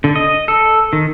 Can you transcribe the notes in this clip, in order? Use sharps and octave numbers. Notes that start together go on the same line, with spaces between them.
D3
D#5
A4
D#3